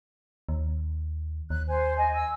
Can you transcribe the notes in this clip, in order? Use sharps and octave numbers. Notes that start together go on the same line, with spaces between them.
D#2
D#2 F#6
C5 G#5
D#5 G#5
E6